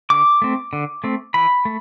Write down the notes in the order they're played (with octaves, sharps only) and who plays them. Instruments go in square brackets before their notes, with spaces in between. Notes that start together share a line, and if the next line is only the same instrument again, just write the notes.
[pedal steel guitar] D3 D6
A3 C4
D3
A3 C4
E3 B5
A3